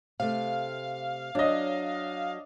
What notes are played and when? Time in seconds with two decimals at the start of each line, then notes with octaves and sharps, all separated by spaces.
0.20 C3 A3 F5
1.35 F#3 D4 D#5